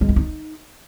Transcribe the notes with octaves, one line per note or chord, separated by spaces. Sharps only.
G#3
E4
D#4